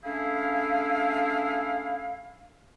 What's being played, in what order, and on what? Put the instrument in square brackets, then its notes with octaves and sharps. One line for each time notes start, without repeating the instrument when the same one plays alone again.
[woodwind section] A3 C#4 D4 E4 G#4 F5